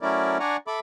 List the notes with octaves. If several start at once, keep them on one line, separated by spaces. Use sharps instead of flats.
F#3 A3 C#4 E4 A#4 D5
D4 D5 F#5 G#5 A#5 C#6
A4 E5 B5 D6